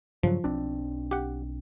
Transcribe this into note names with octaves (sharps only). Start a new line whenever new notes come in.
G2 C#3 F3 F#3
B1 C4 D4
G4 F#5